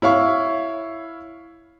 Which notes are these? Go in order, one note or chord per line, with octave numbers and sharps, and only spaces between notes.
E4 C#5 F5 C#6